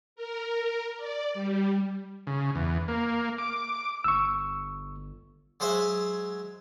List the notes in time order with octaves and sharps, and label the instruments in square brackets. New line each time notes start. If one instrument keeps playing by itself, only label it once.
[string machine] A#4
D5
G3
[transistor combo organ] C#3
E2
A#3
D6
[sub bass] G1 [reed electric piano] C#6 E6
[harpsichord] F#3 G#3 C5 E5